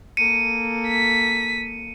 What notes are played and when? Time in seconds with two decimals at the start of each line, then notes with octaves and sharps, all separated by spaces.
0.17 A#3 A4 C#7 D#7
0.88 B6